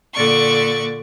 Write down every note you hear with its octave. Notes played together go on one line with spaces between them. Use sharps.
A#2 D3 D5 C#6